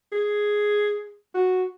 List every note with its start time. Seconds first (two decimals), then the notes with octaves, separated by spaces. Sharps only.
0.12 G#4
1.34 F#4